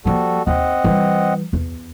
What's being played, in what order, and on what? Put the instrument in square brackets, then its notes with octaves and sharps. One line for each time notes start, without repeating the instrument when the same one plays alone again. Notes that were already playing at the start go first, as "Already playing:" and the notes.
[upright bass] F3 A#3 [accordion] G3 F#4 A4
[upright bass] D#2 [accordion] C4 D#5 F#5
[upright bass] E3 G3
E2